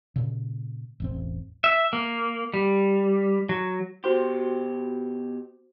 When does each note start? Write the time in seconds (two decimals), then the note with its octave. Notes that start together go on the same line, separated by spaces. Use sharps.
0.16 A#2 C#3
1.00 E1 A1 C4
1.64 E5
1.93 A#3
2.54 G3
3.49 F#3
4.04 B2 F#4 G4 C5 C6